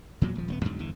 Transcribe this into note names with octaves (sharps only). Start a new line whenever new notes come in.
E2 A#2 F#3
D#1 F3
D#1 A3 B3
E2 G#2 D3 F#3
G1 E2 E3